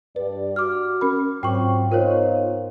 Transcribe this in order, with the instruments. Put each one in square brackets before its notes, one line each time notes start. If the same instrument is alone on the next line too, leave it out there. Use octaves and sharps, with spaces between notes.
[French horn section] G2 D5 [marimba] B4
[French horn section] F#4 [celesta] D6 F6
[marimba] C#4 A#4 B5
[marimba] G#2 [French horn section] F#3 C4 F4 [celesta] G5 C#6
[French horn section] B3 D#4 F4 [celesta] A#4 C5 C#5